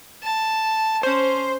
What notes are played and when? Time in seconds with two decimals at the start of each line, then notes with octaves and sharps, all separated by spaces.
0.23 A5
1.03 C#4 C5